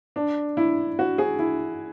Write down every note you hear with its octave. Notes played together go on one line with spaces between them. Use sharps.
D4
E4
F#4
G#4
E4